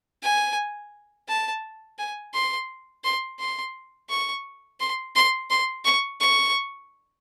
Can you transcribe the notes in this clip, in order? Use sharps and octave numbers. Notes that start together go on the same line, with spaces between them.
G#5
A5
G#5
C6
C6
C6
C#6
C6
C6
C6
C#6
C#6